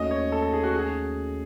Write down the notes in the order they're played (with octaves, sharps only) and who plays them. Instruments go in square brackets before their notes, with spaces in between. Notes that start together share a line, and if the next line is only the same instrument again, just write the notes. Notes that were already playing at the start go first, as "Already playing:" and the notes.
Already playing: [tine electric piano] D#2 D#3 A3 C#4 F#4 [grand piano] D#5
[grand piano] C#5
A4
A4
G#4
F#4
G#4